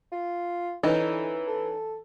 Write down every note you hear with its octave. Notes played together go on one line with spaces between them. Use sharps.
F4
D3 E3 C#4 D#4
A4